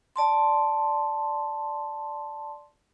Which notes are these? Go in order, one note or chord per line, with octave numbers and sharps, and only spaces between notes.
D5 A5 C6